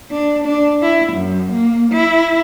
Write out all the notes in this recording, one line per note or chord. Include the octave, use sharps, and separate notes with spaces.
D4
D4
E4
F#2
A#3
E4